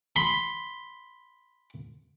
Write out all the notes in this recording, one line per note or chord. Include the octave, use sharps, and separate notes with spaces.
B5 C6